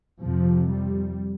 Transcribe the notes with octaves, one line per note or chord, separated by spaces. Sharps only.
F2 C3 F3
G3